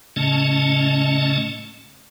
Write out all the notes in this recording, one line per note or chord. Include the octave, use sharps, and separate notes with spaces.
A2 C#3 A3 C#4 D#5 A5